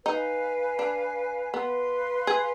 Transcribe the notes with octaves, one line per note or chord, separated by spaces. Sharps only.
D#4 B4 F5 G#5
D4
B3 B4 F5 C6
G#4